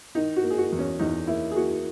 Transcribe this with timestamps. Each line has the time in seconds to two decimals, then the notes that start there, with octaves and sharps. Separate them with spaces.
0.15 D#3 D#4
0.36 F#4
0.44 A#3
0.50 G#4
0.58 F#4
0.72 E2
0.79 C#4
0.99 E2 D#4
1.27 A#3 E4
1.52 G#4
1.56 A#3 F#4